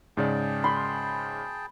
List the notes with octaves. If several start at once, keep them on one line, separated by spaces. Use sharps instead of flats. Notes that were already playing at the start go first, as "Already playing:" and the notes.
G#2 C#3 G#4 D5 G5 A5
B5 C6